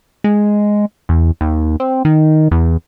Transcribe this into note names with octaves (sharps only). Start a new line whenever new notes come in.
G#3
E2
D#2
C4
D#3
E2